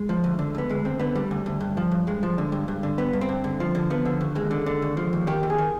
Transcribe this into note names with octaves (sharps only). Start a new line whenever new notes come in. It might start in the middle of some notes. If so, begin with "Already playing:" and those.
Already playing: G#3
F3
D2
D3
D2 B3
D2 G#3
D2 C4
D3 B3
D2 G3
D2
D2
G2
F3
G2
G2 G#3
F3
D3
G2
G2
D3
G2 B3
G2
C4
G2
D3
F3
D3
F3 B3
D3
D#2
D#2 G#3
D3
D3
D#2
F3
D#2
D#3 G4
D#2
G#4
D#3